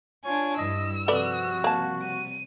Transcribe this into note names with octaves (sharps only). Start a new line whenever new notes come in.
D4 F4 C#5 G#5
G2 E4 D#5 E6
C3 F3 G3 F#4 A4 B4 D5
A#3 A5
D#7